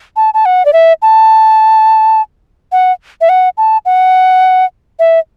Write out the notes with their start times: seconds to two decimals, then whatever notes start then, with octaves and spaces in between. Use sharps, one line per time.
0.17 A5
0.34 A5
0.45 F#5
0.65 D5
0.73 E5
1.02 A5
2.72 F#5
3.21 E5
3.29 F#5
3.58 A5
3.86 F#5
4.99 E5